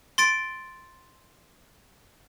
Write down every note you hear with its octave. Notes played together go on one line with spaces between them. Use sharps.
C6 A6 D7